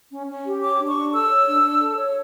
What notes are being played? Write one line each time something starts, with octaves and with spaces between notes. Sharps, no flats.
C#4
C#4
G4
C#5 D6
D4
C#6
D4
A4 E6
C#5
D4
D4
A4
C#5